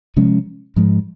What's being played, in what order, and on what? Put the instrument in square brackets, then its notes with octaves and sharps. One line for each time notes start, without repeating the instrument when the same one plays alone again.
[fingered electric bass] C3 F3 G#3 C#4
G#2 F3 G#3